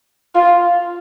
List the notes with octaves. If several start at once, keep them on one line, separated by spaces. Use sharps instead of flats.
F4